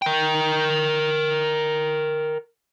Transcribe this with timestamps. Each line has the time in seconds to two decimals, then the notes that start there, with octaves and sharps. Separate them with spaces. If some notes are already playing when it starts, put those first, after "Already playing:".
0.02 A#4 G5